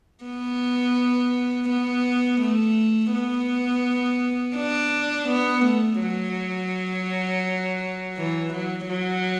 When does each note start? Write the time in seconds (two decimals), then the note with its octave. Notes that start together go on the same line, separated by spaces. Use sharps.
0.24 B3
1.69 B3
2.41 A3
3.13 B3
4.57 D4
5.28 B3
5.65 A3
6.01 F#3
8.17 E3
8.53 F#3
8.89 F#3